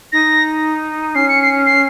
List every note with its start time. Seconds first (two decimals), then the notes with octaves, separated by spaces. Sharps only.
0.12 D#4 A#6
1.15 C#4 C7
1.29 C#7
1.42 C7
1.66 C7